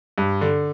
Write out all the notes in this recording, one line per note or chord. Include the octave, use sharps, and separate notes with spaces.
G2
D3